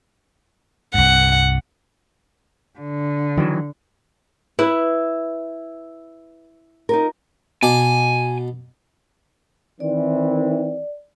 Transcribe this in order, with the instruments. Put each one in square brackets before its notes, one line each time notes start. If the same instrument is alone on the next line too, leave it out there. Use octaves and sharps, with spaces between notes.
[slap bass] C2 G2 [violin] F#5
[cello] D3
[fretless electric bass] D#3 E3 F#3
[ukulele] E4 [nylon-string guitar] B4
[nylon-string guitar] D#4 F4 A#4
[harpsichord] B2 A5 D6 [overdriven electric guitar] G#5
[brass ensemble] D#3 E3 C4 [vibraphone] D5